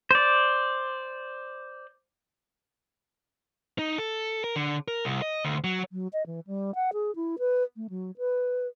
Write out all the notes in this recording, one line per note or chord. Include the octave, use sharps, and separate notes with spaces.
C5 D5
D#4
A4
A#4
D3
A#4
C2
D#5
D2
F#3
F#3
D#5
E3
G3
F#5
G#4
E4
B4
A3
F#3
B4